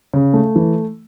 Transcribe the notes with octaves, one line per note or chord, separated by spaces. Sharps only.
C#3
A3
E3